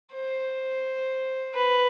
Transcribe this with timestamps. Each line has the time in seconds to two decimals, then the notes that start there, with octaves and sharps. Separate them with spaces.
0.13 C5
1.55 B4